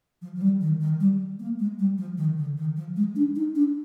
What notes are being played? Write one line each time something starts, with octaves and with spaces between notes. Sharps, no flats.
F3
F3
G3
D#3
D#3
G3
A#3
G#3
G3
F3
D#3
D3
D#3
F3
G#3
D4
D#4
D4